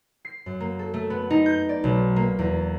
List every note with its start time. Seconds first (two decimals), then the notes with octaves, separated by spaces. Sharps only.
0.25 C7
0.46 F#2
0.60 A#3
0.79 A4
0.94 A3
1.10 B3
1.30 D#4
1.46 G6
1.69 D5
1.84 B1
2.16 A#3
2.39 E2